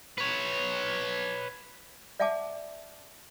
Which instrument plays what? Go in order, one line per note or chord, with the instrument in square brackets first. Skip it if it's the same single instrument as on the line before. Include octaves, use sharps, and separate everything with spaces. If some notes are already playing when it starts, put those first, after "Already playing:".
[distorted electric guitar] B4 C#5
[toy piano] D5 E5 F#5 G#5 A5 D6